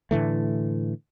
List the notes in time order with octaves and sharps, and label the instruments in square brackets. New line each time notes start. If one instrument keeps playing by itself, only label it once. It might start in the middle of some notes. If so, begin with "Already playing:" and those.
[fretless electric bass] A2 D3 E3 A3